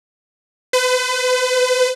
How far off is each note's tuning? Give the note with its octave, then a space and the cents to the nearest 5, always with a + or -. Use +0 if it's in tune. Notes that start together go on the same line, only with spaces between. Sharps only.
B4 +40